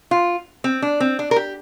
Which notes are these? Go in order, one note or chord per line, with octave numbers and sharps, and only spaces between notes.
F4
C4
D4
C4
D4
A#4
G4